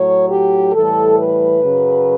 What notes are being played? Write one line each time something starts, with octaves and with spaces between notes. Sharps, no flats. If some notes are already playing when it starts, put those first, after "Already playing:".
Already playing: A2 F#3 C#5
G4
A2 E3 G3 A4
B4
F#2 C#3 F#3